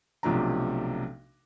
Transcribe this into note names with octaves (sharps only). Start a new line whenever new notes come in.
B1 C3 F3 A3 D4 A#5